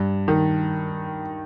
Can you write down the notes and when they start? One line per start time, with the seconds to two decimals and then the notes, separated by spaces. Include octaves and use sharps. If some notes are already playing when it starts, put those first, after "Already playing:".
Already playing: G2
0.28 D#3